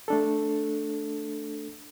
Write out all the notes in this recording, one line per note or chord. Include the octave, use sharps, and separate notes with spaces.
A3 D4 A4